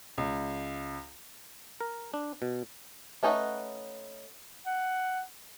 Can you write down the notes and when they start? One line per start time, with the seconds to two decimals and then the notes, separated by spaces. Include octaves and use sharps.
0.18 C#2
1.81 A#4
2.14 D4
2.42 B2
3.23 A3 C#4 D#4 B4 F#5
4.66 F#5